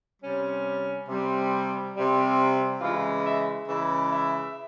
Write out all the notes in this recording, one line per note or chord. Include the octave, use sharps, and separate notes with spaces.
C3 G3 C#4
C3 G3
C3 G3
C#3 E3 G#3 F4
E5
C#3 E3 G#3 E5
E5